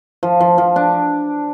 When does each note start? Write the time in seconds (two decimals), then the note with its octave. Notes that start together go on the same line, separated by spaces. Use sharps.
0.23 F3
0.41 F3
0.58 F3
0.76 D4